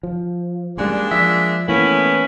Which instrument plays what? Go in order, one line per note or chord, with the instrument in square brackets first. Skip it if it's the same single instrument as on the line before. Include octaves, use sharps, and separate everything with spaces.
[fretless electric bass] F3
[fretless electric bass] A1 G3 [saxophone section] G#3 A#3 D4
[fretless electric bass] F3 [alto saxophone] E5
[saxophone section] A2 B3 [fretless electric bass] E3 A#3 [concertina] C#4 [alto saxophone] E4